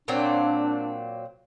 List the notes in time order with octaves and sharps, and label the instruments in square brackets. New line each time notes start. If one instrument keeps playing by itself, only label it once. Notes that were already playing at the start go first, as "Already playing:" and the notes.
[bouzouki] A#2 F#3 C4 [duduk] D4